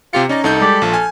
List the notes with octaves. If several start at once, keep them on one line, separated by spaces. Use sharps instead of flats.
C3 F4 G4 C#7
C#4 D#4 D5 A#5
C2 D#4 A4 C#6 G6
G3 G#3 G4 D5 B5
A#1 F3
G#5 F6